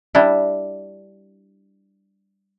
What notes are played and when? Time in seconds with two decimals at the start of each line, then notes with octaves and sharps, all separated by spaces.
0.15 G3 D4 E4